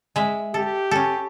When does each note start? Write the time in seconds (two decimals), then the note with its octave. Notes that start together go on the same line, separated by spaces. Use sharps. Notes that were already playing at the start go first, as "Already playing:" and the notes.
0.16 G#3 E5
0.54 G4 A4
0.91 C#4 A4